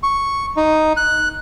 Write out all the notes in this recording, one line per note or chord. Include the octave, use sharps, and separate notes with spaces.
C#6
D#4
F#6